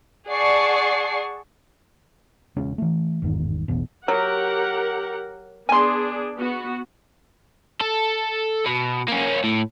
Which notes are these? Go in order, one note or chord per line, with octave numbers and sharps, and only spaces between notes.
G#4 D5 F#5 A5 C#6 C7
E1 C#3 G#3 C#4
E3 A3
G1 E2 G#2 D#3
E1 A1 E2 B2
F#3 G4 A#4 F#5
B3 D4 G#4 G#5 C6
B3 F#4
A4
B2
A#3 C#4
A2